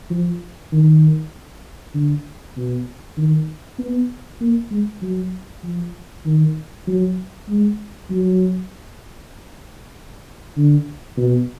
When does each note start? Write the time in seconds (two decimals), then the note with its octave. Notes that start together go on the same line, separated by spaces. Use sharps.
0.10 F3
0.72 D#3
1.94 D3
2.57 B2
3.17 D#3
3.79 B3
4.41 A#3
4.71 G#3
5.02 F#3
5.63 F3
6.26 D#3
6.87 F#3
7.48 G#3
8.10 F#3
10.57 D3
11.17 B2